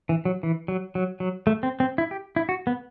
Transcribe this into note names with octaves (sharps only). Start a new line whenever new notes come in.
E3
F#3
E3
F#3
F#3
F#3
A3
C4
C4
E4
G4
E4
F#4
B3